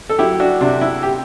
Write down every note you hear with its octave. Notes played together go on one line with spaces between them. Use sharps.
A4
F#3 E4 G4
D4 F#4
C3 D4
E4
G4